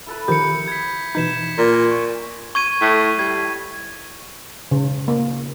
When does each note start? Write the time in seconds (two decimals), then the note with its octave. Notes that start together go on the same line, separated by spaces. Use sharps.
0.06 E4 A4 B4
0.28 D#3 F3 G4 A#5 G6 C#7
0.68 B3 G#6 B6
1.15 B2 E3 D#4 G6 B6 E7
1.58 A#2 A#4 G#5
1.91 C#6
2.55 C#6 G#6 D#7
2.81 A2
3.19 G3 G#6
4.71 C#3
5.08 A#3